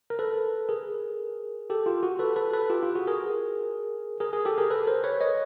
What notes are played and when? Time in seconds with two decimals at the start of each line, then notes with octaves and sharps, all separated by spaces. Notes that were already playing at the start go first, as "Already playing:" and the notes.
0.10 A#4
0.19 A4 B4
0.69 G#4 A#4
1.70 G4 A4
1.86 F4 G4
2.03 F#4
2.19 A4 B4
2.36 A4 B4
2.53 A4 B4
2.70 F4 G4
2.82 F4
2.95 F#4 G#4
3.07 G#4 A#4
4.20 G#4 A#4
4.33 G#4 A#4
4.45 G4 A4
4.58 G#4 A#4
4.71 A4 B4
4.87 A#4 C5
5.04 B4 C#5
5.21 C#5 D#5